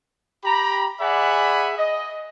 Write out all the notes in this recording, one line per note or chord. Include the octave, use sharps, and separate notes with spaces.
G4 A#5 B5
G#4 D5 E5 F#5 G#5 B5
D#5